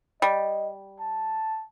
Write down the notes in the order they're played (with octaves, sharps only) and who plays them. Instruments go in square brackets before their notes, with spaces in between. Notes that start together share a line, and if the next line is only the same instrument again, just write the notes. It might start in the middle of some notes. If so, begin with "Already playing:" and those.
[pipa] G3 [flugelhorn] D#5
[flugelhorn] A5